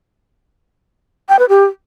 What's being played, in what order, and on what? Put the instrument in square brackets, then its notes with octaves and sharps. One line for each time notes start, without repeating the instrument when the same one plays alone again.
[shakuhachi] G5
B4
G4